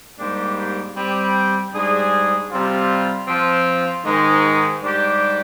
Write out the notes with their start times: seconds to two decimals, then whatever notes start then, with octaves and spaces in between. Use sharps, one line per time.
0.19 G#2 G3 A#3 D4 G4
0.96 G3 C4 G4
1.73 G#2 G3 D4 G#4
2.51 C3 G3 C4 F4
3.27 F3 C4 F4
4.05 G#2 D#3 G#3
4.82 G#2 G3 D4 G4